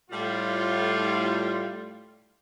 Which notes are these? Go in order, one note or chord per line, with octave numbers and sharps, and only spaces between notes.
A2 G3 F4